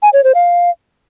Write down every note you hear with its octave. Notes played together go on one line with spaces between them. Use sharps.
G#5
C#5
C5
F5